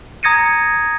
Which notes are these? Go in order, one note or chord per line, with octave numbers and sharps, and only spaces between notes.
A#5 D#6 G#6 A#6 C#7 D#7